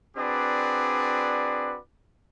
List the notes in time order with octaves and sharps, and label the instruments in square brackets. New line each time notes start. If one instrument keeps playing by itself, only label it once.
[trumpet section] C4 D4 F#4 G#4 B4 D5